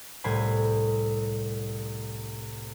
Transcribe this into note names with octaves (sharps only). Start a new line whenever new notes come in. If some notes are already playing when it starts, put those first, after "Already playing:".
C2 A2 C5 G#5 B5